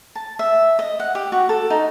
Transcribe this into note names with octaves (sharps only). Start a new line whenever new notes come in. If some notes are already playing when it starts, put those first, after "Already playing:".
A5
E5
D#5
F#5
G4
F#4
A4
D#4